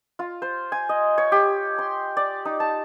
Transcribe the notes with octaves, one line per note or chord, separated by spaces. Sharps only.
F4
C5
G#5
D#5
C#5
G4
C6
D5
D#4
A5